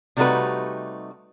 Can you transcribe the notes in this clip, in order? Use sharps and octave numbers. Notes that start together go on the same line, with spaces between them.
C3 G3 A3 D#4 F#4 B4